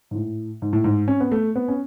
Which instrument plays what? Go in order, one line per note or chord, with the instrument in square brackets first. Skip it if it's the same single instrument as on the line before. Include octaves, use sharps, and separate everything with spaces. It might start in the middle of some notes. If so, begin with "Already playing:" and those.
[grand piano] G#2
A2
G#2
A2
G#2
C#4
B3
A3
B3
C#4